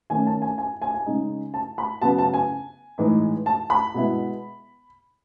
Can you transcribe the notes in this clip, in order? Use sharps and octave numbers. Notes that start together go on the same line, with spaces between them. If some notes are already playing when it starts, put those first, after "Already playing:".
D#3 A3 C#4 G#5
A5
G#5
G#5
G#5
G#5
C#3 G#3 D#4
A5
B5
C#3 F#3 B3 A5
A5
G#5
A2 E3 G#3 D#4
A5
B5
B2 G#3 B3 E4